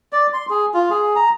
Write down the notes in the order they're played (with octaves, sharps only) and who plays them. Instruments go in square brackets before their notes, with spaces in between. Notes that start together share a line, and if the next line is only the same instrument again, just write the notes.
[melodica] D5
C6
G#4
F4
G#4
A#5